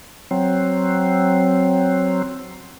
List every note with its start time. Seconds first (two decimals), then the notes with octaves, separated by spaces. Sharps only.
0.31 F#3 C4